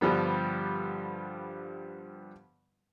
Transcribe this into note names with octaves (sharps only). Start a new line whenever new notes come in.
G2 D3 F3 G3 B3